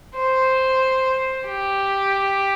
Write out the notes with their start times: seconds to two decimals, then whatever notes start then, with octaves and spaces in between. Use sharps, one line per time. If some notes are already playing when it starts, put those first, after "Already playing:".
0.16 C5
1.48 G4